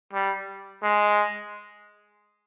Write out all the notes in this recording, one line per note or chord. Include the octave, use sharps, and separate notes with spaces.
G3
G#3